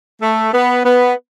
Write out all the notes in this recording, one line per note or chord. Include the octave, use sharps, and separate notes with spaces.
A3
B3
B3